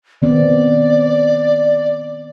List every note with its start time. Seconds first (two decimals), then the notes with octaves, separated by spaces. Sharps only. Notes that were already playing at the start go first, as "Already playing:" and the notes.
0.22 D#3 B3 C4 D5